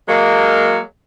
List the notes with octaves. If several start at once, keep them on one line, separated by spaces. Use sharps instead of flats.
F#3 G#3 A#3